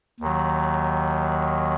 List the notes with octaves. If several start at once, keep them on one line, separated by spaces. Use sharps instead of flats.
D#2 D#3 F#3